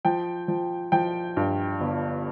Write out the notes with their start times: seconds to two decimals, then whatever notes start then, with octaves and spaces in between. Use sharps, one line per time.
0.05 F3 G5
0.48 F3
0.92 F3 G5
1.37 G2
1.80 G1